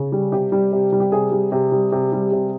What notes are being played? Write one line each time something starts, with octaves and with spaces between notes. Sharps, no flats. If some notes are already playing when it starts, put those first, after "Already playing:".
Already playing: C#3
G3
C3 G4
G3
C3
G3
G4
C3 G#4
G3
C3
G3
C3
G3
C3